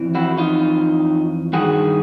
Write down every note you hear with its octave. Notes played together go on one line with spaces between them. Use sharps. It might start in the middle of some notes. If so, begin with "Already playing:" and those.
Already playing: F2 E3
E4 F#4
D#4 F4
G2 D#3 F#4 G#4